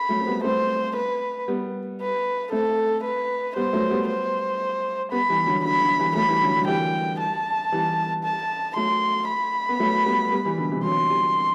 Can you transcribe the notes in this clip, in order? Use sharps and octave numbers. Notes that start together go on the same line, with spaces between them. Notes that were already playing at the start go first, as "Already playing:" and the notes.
Already playing: B5
F#3 A3
C4
G3 B3
A3 C4 C5
B4
G3 B3
B4
A3 C4 A4
B4
G3 B3 C5
F#3 A3
G3 B3
C5
G3 B3 B5
E3 G3
D3 F#3
D3 F#3 B5
D3 F#3
E3 G3
F#3 A3 B5
E3 G3
D3 F#3
D3 F#3
E3 G3 G5
A5
E3 G3
A5
F#3 A3 C6
B5
B3
F#3 A3
G3 B3
G3 B3
E3 G3
B2 D3
C3 E3
G3
D3 F#3 C6
E3 G3